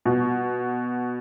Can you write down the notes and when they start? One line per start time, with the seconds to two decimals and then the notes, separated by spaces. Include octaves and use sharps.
0.05 B2